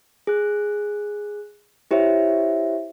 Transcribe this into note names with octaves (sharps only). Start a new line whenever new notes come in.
G#4 F#6
E4 G4 C5 C#5 E5